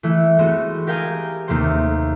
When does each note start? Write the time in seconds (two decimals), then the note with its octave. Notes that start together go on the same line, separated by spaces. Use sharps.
0.03 E3 A3 E4
0.39 G#3 A3 B3 C4 F#4
0.87 G4 A#4 F5 G5 G#5 D#6
1.48 D#2 C3 A3 A#3 C5